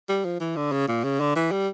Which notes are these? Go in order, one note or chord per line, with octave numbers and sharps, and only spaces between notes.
G3
F3
E3
D3
C#3
A#2
C#3
D3
E3
G3